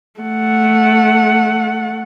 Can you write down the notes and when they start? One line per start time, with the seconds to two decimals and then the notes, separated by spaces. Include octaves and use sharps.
0.20 A3 F#5